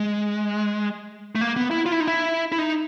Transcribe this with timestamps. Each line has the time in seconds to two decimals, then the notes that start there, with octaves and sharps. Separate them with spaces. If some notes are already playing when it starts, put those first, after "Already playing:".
Already playing: G#3
1.35 A3
1.41 A#3
1.56 B3
1.71 E4
1.86 F4
1.92 E4
2.00 D#4
2.07 E4
2.52 E4
2.58 D#4